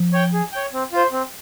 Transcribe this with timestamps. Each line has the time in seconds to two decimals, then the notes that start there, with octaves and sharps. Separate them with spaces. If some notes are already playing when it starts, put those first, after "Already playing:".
Already playing: F3
0.13 C#5 G5
0.33 G#4
0.52 C#5 G5
0.73 C4
0.92 F4 C5
1.12 C4